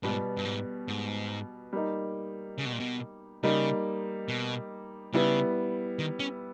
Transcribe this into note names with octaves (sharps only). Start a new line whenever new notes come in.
G#2 B2 G3 B3
G2
G#2
G#2
G3 A#3 D#4
C#3
B2
A#2
B2
C#3 G3 A#3 D#4
B2
C#3 G3 B3 E4
D#3
C#4